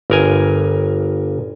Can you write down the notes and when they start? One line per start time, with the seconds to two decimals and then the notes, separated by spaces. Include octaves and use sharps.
0.10 G1 A#4 G#5